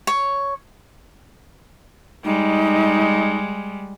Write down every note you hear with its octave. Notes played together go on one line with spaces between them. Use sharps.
C#5
G3 G#3 D#4